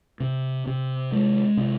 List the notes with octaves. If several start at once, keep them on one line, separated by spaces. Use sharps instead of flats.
C3
C3
G#3
C3